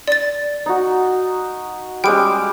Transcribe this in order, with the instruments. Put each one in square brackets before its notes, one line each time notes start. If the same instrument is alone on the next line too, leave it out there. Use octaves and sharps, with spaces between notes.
[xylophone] D5 A6
[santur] D#4 F#4
[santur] G3 G#3 C#4 [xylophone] G5 D7